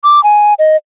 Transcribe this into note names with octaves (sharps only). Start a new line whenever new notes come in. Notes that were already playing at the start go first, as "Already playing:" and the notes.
D6
G#5
D#5